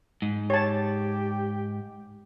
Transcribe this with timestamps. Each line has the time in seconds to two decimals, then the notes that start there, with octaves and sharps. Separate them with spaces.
0.22 G#2
0.50 G4 C#5 A5